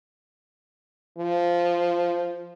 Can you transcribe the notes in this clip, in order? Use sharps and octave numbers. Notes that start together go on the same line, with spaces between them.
F3